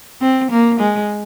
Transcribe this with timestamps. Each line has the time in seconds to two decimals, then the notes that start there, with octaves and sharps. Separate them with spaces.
0.21 C4
0.51 A#3
0.80 G#3